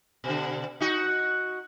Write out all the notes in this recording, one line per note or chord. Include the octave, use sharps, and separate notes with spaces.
B2 D3
D#4 F#4